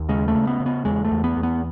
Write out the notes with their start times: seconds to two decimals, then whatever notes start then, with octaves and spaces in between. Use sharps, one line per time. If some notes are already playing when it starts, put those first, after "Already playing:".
Already playing: D#2
0.09 C#3 G#3
0.28 A3
0.35 C#3
0.47 B3
0.60 C#3
0.66 B3
0.85 E2 G#3
1.05 A3
1.11 E2
1.24 B3
1.37 E2
1.43 B3